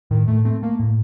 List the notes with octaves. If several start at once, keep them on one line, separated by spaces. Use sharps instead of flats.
A2 D#3
A2 A3
A3 C4
A3 A#3
A2